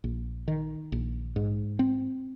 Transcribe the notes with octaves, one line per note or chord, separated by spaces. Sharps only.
A#1
D#3
A#1
G#2
C4